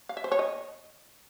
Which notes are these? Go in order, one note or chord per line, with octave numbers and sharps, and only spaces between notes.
F5
E5
C5
C#5
D#5